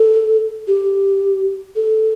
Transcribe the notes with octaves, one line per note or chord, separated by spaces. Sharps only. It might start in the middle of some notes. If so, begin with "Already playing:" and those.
Already playing: A4
G4
A4